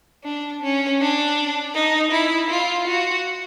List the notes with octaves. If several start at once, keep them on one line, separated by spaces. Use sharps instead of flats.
D4
C#4
D4
D#4
E4
F4
F#4